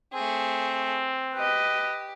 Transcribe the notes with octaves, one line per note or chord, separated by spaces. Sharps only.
A3 C4 G#4
G4 B4 D#5